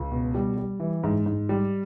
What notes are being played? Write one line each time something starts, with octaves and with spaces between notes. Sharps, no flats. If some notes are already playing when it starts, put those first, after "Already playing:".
Already playing: C#2
B2
G3
G3
E3
G#2
G#2
G3